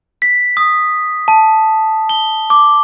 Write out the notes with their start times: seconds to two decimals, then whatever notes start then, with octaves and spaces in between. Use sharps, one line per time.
0.22 B6
0.57 D#6
1.28 A5
2.09 G7
2.50 D6